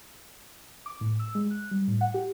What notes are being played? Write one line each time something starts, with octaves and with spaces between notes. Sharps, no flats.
D6
A2
E6
G#3
F#6
G3
A2
F#5
G4